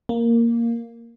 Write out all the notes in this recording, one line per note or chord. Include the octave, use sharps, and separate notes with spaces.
A#3